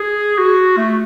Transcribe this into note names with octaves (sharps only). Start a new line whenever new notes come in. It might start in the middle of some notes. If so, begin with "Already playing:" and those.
Already playing: G#4
F#4
A3